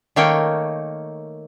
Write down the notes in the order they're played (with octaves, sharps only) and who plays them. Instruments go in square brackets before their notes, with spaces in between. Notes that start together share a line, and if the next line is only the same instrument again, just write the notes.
[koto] D#3 A3 A#3 C#5 G5